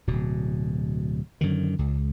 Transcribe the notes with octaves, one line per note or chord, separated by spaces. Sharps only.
D1 B2
F#2 D3 D#3
C#2